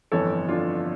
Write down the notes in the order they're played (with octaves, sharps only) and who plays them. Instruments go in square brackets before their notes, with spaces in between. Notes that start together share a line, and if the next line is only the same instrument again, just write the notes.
[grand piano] G1 F2 E3 A4 C#5
D4 F4